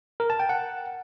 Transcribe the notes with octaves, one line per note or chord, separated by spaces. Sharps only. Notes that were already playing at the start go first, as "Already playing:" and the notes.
A#4
A5
G5
F#5